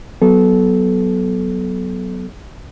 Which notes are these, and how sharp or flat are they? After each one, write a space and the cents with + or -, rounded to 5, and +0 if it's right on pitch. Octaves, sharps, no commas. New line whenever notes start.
F#3 +15 B3 +0 A4 -20